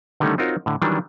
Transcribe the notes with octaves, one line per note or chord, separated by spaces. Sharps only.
D3 D#3 G3 A3 C#4 D#4
C4 D#4 F4 F#4 A#4 C#5
A2 D3
D#3 E3 F#3 G3 D4